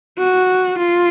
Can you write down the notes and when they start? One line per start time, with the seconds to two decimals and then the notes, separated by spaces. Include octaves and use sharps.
0.18 F#4
0.78 F4